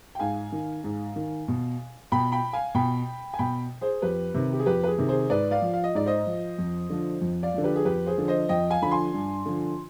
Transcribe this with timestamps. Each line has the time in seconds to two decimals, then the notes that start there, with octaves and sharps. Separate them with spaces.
0.15 G5
0.19 G#2 F5 G#5
0.52 D#3
0.84 G#2
1.16 D#3
1.48 B2
2.12 B2 G5 B5
2.32 G5 B5
2.53 F5 G#5
2.75 B2 G5 B5
3.34 G#5
3.39 B2 G5 B5
3.81 G#4 C5
4.02 F2 G4 B4
4.34 C3 D#3
4.53 G4
4.59 G#4
4.66 F2 G4 B4
4.84 B4
4.87 G#4
4.98 C3 D#3
5.09 G#4 C5
5.30 G#2 B4 D5
5.51 D5 F5
5.62 F3
5.74 F5
5.84 D#5
5.95 G#2 D5
6.06 C5 D#5
6.27 F3
6.58 F2
6.90 D3 F3
7.21 F2
7.43 D5 F5
7.54 D3 F3
7.64 G4 B4
7.76 G#4
7.85 F2 G4 B4
8.06 G#4 C5
8.18 D3 F3
8.28 C5 D#5
8.49 F2 D#5 G5
8.70 F5 G#5
8.82 D3 F3 B5
8.91 G#5 C6
9.14 G2
9.46 D3 F3